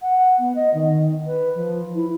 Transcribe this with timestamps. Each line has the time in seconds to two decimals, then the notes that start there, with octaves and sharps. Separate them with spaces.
0.01 F#5
0.38 B3
0.55 D#5
0.74 D#3
1.26 B4
1.55 F3
1.94 E4